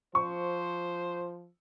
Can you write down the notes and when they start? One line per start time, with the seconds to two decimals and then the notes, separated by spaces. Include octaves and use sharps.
0.15 F3 C5 C#6